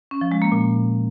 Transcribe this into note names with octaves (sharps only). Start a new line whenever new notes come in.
C#4
F3
G#3
A#3
A#2